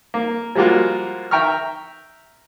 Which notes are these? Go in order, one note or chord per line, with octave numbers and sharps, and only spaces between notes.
A#3
F3 G3 G#3 A#3 F4 F#4
E5 G5 A#5 C#6 F6